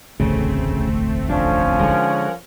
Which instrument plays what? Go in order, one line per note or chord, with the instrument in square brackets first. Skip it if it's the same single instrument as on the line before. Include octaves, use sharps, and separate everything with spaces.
[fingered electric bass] E1 A1 D2 [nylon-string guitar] C#3 [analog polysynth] A3 C4
[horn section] F3 C#4 [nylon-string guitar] D4
[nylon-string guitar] D3 G#3 D#4 [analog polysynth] A#4 F#5